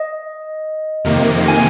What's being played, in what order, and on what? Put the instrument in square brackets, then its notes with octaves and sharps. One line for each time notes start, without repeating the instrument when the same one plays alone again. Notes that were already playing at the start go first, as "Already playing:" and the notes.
Already playing: [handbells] D#5
[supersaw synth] F2 C3 D#3 A#3
[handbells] G#5